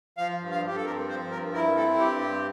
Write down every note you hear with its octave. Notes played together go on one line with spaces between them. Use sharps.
F3 F5
G2
F5
G2 G4
A4
C4 A#4
F3 C5
G2 A#4
E4 A#4
C4 A4
G2 G4
C4